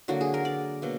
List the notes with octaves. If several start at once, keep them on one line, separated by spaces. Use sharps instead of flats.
D3 F#3 A#3 F#4
G#4
A#4
D5
B2 F#3 A#3